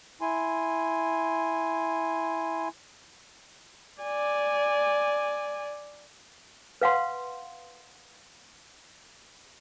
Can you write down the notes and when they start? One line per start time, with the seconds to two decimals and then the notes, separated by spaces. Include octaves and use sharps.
0.21 E4 G#5 C6
4.03 D5 G#5
6.81 B4 F5 F#5 C6